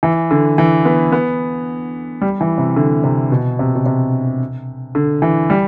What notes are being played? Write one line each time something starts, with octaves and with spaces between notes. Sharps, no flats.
E3
D3
E3
B3
B3
G3
E3
C3
D3
C3
B2
C3
B2
C3
D3
E3
G3